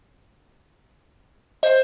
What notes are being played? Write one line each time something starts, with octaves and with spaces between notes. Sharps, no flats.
C5 D#5